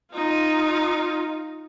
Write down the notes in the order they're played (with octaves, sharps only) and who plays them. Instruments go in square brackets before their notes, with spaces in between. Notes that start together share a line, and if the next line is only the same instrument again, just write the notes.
[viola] D#4 F4